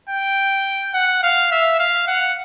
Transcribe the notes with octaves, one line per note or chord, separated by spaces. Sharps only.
G5
F#5
F5
E5
F5
F#5